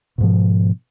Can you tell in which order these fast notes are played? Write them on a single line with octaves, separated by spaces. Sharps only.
B2 G#2 F3